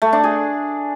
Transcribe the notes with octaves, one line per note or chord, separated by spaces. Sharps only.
A3
D4
G#4